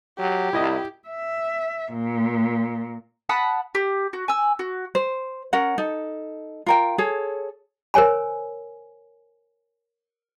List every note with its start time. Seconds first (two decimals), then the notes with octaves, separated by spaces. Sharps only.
0.19 F#3 G4
0.53 C2 E4 D#5
1.08 E5
1.93 A#2
3.29 F#5 A5 B5 D#6
3.75 G4
4.13 F#4
4.28 G#5 E6
4.59 F#4
4.95 C5
5.53 C#4 A#4 F#5
5.78 D#4 A4
6.66 F4 A#4 G5
6.98 G#4 A4 C#5
7.94 A#4 C5 C#5 G#5 B5